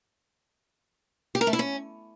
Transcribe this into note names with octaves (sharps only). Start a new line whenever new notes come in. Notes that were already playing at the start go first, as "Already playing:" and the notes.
G4
A#4
A3
E4
C#4